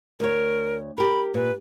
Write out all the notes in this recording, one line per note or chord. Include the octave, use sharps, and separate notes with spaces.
D2 A#4 C#5
G4 A#4 B5
A#2 B4